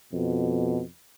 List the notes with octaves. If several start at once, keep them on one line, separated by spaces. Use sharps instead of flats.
F2 B2